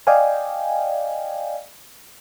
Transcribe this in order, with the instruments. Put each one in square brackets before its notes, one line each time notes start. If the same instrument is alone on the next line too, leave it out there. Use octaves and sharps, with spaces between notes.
[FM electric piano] D5 D#5 F5 G5 G#5